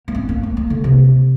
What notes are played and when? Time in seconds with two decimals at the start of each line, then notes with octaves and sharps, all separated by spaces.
0.08 A#3
0.15 C4
0.29 A#3
0.43 C4
0.57 A#3
0.70 D3
0.84 C3